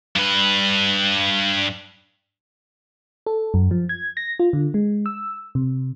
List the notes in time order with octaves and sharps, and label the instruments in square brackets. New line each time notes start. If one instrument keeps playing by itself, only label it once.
[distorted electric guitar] G2 B4
[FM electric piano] A4
F#2
F3
G#6
A#6
F4
D3
G#3
E6
C3